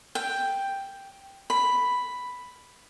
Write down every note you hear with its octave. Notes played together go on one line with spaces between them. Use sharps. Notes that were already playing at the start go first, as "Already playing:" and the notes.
G5
B5